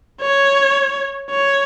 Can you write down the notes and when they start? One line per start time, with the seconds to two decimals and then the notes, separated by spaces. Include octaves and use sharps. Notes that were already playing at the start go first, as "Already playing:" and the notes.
0.21 C#5
1.30 C#5